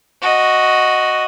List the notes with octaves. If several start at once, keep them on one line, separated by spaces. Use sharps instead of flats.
F#4 D#5